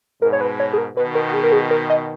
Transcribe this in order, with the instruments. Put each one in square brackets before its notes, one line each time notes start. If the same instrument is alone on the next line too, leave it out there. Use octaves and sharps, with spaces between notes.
[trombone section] G#2 B2 [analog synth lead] A#4
[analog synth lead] C#5
B4
C#5
G#4
A#4
[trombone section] B2 D#3 [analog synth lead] B4
[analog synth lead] A#4
F#4
G#4
A#4
G#4
A#4
D#5